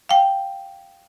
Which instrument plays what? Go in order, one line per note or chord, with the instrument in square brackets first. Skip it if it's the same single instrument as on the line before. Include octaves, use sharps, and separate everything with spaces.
[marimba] F5 G5